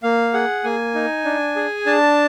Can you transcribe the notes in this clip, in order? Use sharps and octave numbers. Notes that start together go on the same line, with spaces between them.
A#3 F5
G#4 F#5
A#3 G#5
D#4
D4
G#4
D4 A5